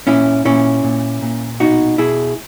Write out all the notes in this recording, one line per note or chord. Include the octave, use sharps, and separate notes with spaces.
A#2 C#4 E4
A#2 C#4 E4
A#2
A#2
B2 D#4 F#4
B2 E4 G#4